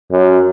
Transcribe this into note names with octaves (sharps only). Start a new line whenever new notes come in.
F#2